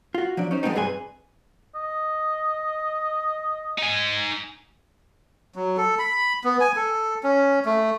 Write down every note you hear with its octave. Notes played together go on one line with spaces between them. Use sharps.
F4 F#4
F3 F#3 D4
C#4 D#4 C5
F3 G#3 A3 B3 C4 D#4
G2 C3 G#4 B4 G#5 C6
D#5
D#4 G#5
F#3
A4
B5
B3
G#5
A4
C#4
A3